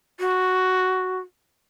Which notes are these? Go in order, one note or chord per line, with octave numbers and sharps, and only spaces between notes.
F#4